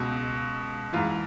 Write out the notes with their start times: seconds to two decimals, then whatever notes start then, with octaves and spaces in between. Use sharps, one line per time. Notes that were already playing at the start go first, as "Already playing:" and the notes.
Already playing: C#2 B2
0.93 G#2 E3 F4